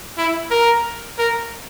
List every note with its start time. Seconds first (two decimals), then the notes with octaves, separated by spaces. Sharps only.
0.18 E4
0.50 A#4
1.18 A#4